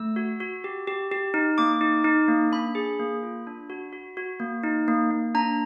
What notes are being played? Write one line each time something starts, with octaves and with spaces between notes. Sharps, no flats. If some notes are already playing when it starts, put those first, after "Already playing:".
Already playing: A3 E6
F#4
F#4
G4
G4
G4
D#4
A#3 D6
D#4
D#4
A#3
D4 B5
G#4
A#3
F4
D4
F#4
F#4
F#4
A#3
D#4
A#3
A#3
D4 A#5